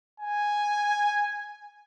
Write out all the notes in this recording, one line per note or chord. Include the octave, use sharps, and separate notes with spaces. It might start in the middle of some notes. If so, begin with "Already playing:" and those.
G#5